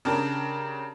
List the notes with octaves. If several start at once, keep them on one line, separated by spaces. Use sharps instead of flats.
C#3 D4 G4 A#4